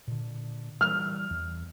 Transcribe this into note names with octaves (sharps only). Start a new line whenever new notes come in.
A#2 D3
E3 G3 F6
E2